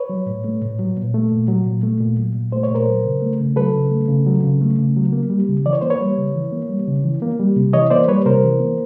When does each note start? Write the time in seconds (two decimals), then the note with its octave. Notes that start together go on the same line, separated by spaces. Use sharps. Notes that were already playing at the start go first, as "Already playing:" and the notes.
Already playing: B4 C#5
0.09 F#3
0.26 A2
0.44 A3
0.61 A2
0.79 F#3
0.97 A#2
1.14 A3
1.32 A#2
1.48 F#3
1.66 A#2
1.83 A3
2.00 A#2
2.17 F#3
2.35 A#2
2.52 A3 C5
2.63 C#5
2.71 A#2 A#4 C5
2.87 F#3
3.05 C#3
3.22 A3
3.40 C#3
3.56 F#3 A4 B4
3.75 C#3
3.92 A3
4.08 C#3
4.27 F#3
4.43 C#3
4.61 A3
4.79 C#3
4.96 F#3
5.12 A#3
5.30 G3
5.48 C#3
5.65 E3 D5
5.73 C#5
5.81 A#3 C5
5.90 B4 C#5
6.01 G3
6.17 C#3
6.35 E3
6.52 A#3
6.69 G3
6.87 C#3
7.04 E3
7.22 A#3
7.39 G3
7.56 C3
7.73 E3 C#5 D#5
7.90 A#3 C5 D5
8.08 G3 B4 C#5
8.25 C3 A#4 C5
8.43 E3
8.60 A#3